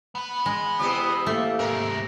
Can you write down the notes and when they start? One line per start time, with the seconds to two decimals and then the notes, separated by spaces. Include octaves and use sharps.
0.15 B3 B4
0.46 G#3
0.79 E2 C3 G4 D#6
1.26 A3 A#3
1.59 G#2 C3 A#4